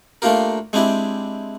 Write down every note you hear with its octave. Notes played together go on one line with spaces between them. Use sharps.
A3 A#3 D4 F4 G4 A#4
G#3 C4 D4 E4 G4